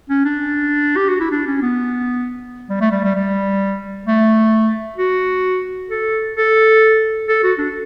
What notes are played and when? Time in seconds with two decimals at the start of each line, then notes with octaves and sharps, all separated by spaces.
0.10 C#4
0.25 D4
0.97 G4
1.09 F#4
1.21 E4
1.31 D4
1.47 C#4
1.62 B3
2.70 G3
2.81 A3
2.92 G3
3.04 G3
3.15 G3
4.07 A3
4.98 F#4
5.90 A4
6.36 A4
7.28 A4
7.43 F#4
7.59 D4